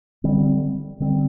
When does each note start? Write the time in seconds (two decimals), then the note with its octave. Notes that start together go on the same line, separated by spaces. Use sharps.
0.24 D3 G3 C4
1.00 D3 G3 C4